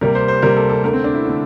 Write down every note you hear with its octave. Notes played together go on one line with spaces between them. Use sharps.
C3 G3 A#3 A#4
C5
C5
C3 G3 A#3 A#4
A4
A4
D3 A3 A#4
C4
D4
E4
D3 A3